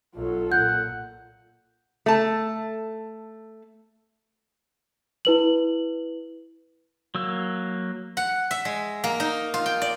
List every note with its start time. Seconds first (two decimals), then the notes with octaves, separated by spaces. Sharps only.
0.15 B1 F#3 F4 A4
0.52 A#2 F#5 G6
2.06 A3 A5
5.25 E4 B4 F#7
7.15 F#3 A#3 E6
8.17 F#5
8.51 E5
8.65 G#3
9.04 A#3
9.20 D#4
9.54 F4
9.66 G5
9.82 D5